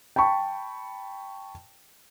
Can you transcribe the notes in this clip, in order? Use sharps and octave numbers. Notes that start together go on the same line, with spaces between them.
G5 A5 B5 C#6